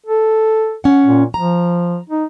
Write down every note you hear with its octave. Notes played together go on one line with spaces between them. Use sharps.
A4
C#4 F#5
A#2
F3 A#5
D#4